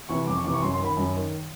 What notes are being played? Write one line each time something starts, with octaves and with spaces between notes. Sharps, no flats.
C3 E3 C#6
F2 D6
C#6
C3 E3 D6
C#6
F#2 C6
C6
D#3
B5
F#2
D#3